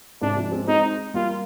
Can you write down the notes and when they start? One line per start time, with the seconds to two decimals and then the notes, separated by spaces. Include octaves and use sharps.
0.22 G#2 C3 D4
0.36 F3 G#3
0.52 G#3 C4
0.67 G#3 C4 D#4
1.14 G3 A#3 F4